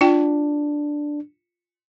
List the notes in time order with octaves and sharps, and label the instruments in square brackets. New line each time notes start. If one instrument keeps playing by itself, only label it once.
[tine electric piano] D4 [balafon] F4 G5